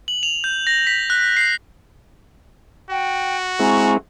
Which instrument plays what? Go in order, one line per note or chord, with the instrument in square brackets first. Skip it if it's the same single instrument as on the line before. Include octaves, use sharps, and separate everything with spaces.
[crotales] F#7
F7
G6
A#6
B6
F#6
C7
[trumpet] F#4 [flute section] G5
[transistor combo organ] G#3 C4 E4 [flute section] G#5 A#5 C#6